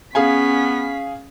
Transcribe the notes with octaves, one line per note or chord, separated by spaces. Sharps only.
B3 C#4 G#4 F5 G#5 B6